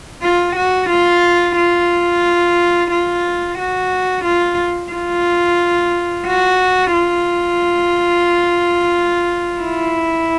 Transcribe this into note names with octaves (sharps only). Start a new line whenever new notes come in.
F4
F#4
F4
F4
F4
F#4
F4
F4
F#4
F4
E4